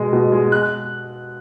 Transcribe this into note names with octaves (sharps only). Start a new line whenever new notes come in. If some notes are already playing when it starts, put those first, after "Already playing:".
Already playing: B2 G#3
B2
G#3
F#6